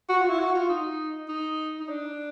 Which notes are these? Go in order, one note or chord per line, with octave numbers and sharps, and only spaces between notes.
F#4
F4
E4
F#4
F4
D#4
D#4
D#4
D4